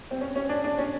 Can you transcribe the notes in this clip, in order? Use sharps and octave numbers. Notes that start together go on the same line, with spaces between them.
C4
C#4
C#4
D4
D4
C#4